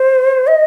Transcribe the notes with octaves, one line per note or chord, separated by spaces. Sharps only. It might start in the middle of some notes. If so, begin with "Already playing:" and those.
Already playing: C5
D#5